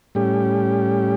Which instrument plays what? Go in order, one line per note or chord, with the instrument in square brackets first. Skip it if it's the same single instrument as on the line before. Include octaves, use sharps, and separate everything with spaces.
[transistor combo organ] A2 G3 C#4 G4